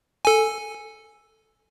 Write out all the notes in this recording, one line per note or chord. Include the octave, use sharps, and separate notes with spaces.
A4 G#5